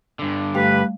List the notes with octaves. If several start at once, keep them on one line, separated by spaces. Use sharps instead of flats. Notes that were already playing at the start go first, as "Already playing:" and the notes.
G2 D3
G3 A3 G4 B4 F5